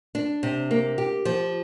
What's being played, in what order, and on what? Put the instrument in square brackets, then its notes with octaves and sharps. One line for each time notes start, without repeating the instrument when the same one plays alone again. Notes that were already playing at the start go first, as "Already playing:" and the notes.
[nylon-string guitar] D4
C3
A#3
G4
F3